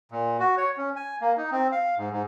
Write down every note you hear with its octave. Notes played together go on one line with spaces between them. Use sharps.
A#2
F#4
C#5
C#4
G#5
A#3
D#4
C4
F5
G#2
G#2